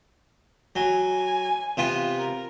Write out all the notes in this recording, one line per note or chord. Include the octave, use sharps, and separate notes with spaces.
F#3 G#5
C3 B3 F4
A#4